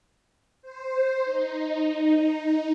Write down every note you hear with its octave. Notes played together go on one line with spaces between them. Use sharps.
C5
D#4